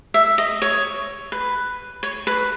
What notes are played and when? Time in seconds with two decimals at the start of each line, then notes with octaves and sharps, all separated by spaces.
0.14 E5
0.38 D#5
0.62 C#5
1.32 B4
2.03 C#5
2.27 B4